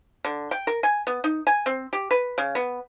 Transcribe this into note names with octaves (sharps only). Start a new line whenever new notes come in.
D3
G5
A#4
G#5
B3
D#4
G#5
C4
G4
B4
C#3
B3